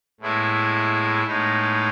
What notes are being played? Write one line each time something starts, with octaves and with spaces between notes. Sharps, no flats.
A2 G#3 B3 E4
A2 G#3 B3 D#4